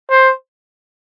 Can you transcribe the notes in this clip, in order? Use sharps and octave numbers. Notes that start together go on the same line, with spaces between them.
C5